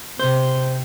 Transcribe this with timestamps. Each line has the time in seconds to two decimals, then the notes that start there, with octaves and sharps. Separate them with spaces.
0.19 C3 C5